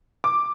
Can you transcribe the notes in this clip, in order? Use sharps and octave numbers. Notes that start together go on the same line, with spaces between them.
D6